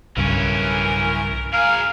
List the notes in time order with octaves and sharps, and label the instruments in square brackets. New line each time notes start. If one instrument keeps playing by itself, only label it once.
[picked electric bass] B1 G2 C#3 [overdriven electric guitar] E3 C#4 [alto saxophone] A#4
[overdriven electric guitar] G#4 A#4 [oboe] F5